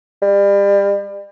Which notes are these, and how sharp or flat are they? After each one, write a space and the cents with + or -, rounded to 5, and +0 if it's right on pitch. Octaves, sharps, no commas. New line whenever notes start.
G3 +35